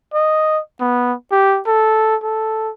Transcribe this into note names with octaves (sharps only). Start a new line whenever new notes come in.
D#5
B3
G4
A4
A4